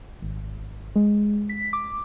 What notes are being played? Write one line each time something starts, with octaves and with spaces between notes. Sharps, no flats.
G#1
G#3
B6
D6